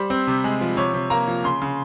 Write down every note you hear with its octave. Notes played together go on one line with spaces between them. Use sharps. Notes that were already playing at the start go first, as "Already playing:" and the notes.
Already playing: G3 C5
C4
C3
G#3
F3
C3 C#5
C3
A#3 A#5
F3
C#3 C6
C#3